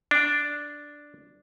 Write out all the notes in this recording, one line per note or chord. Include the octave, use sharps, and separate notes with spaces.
D4